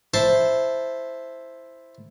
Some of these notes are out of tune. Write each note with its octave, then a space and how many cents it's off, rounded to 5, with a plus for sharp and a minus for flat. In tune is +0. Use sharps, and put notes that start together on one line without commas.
E4 +0 C5 +0 A5 +0